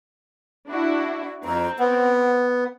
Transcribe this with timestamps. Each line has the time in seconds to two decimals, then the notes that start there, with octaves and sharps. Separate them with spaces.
0.68 D4 E4 F#4
1.45 F2 C4 A#5
1.79 B3 F#5